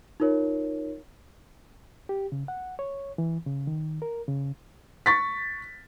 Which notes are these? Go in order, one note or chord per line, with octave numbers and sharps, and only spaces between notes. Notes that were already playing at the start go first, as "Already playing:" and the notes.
D#4 F4 A#4 C#5
G4
C#3
F#5
C#5
E3
C#3
D#3
A#4
C#3
C#6 A6 B6